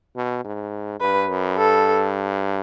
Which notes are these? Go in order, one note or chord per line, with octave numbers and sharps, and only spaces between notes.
B2
G#2
G2 B4
F#2
G2 A4